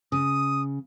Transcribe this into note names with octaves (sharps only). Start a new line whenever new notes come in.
C#3 D#6